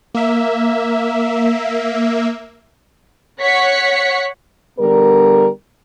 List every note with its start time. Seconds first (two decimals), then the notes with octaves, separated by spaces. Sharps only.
0.14 A#3 E5
3.41 C#5 F#5 B6 C#7
4.78 D3 G3 B3 A#4